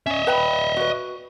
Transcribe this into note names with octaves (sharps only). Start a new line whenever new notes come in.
C#4 D#5 E5
B4 G5 B5
F#4 B4